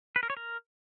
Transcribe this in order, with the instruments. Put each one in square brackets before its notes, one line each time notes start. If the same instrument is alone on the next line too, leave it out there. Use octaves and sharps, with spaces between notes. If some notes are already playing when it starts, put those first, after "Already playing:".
[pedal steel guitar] B4
A#4
C#5
A#4